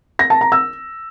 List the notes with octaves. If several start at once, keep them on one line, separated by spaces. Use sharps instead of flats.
A#6
A5
A#5
E6